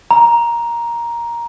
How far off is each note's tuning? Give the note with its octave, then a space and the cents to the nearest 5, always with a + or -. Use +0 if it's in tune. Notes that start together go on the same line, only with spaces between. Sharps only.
A#5 +10